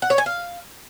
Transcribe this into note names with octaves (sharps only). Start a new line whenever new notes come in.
F#5
C#5
G#5
F5